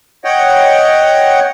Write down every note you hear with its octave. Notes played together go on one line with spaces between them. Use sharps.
C#5 D#5 F#5 G5